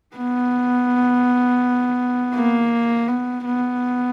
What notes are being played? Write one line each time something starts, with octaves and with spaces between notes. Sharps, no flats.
B3
A#3
B3
B3